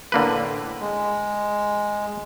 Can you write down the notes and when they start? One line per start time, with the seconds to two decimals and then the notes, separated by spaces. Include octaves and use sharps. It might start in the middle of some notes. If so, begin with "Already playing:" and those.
0.12 A2 D3 A#3 B4
0.81 G#3